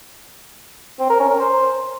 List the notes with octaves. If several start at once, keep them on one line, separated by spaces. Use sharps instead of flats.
C4
A#4
C#4
A#4
C5